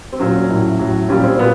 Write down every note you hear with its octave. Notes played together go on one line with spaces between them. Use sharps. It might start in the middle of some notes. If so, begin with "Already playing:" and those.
C4
A#2 F#3 C#4
A2 F#3
A2 F#3
A#2 G3 C#4
C4
A#2 B3